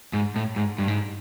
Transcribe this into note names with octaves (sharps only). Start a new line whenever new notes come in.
G#2
A2
G#2
G2
G#2